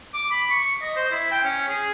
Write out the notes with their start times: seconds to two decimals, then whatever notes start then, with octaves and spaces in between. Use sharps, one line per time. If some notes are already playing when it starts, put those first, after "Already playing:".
0.13 D6
0.31 B5
0.50 C#6
0.82 D#5
0.96 C5
1.11 E4
1.31 G5
1.43 C#4
1.68 G#4